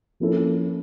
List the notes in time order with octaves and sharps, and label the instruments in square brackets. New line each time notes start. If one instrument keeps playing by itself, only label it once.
[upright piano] F3 A#3 C#4 E4 A4